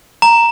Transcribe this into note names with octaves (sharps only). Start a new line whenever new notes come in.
A#5